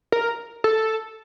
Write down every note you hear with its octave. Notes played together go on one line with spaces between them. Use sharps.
A#4
A4